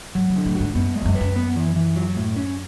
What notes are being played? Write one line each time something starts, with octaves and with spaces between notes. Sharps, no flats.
G#2 F#3
B2
D3
A2
G#2 F#4
F#2 B3
G#3
G#2
F#2
B4
F#2
B3
E3
E3
F#3
A2
C#4